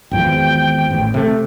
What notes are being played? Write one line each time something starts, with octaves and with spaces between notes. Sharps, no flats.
G#1 E2 F3 G5
A1
C3 A3